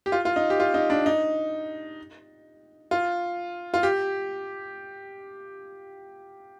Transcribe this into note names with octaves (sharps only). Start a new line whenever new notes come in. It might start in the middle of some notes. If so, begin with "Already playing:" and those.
G4
F4
F4
D#4
G4
F4
D#4
D4
D#4
F4
F4
G4